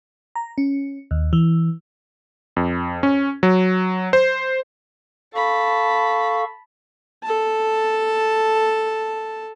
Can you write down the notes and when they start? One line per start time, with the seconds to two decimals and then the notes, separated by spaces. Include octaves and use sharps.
0.35 A#5
0.58 C#4
1.11 D#2
1.33 E3
2.56 F2
3.03 C#4
3.43 F#3
4.13 C5
5.34 A4 F5 A5 B5 C#6
7.23 A4 A5